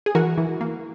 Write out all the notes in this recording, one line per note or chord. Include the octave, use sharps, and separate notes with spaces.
G#4
E3 F#4 A#4
E3
A#3